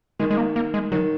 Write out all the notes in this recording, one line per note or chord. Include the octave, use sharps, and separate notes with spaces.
D#3 G#3
G#3
A#3
A#3
G#3
D#3 F#3